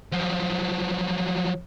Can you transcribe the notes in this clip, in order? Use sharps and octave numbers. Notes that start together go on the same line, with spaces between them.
F3 F#3